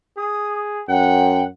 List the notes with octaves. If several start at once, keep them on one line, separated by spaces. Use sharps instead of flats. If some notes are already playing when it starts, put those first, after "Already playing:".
G#4 D#6
F#2 F#5 G5